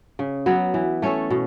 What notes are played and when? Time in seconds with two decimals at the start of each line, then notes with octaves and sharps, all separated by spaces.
0.19 C#3
0.46 F#3 B3
0.74 E3
1.02 A3 C#4 A4
1.30 B2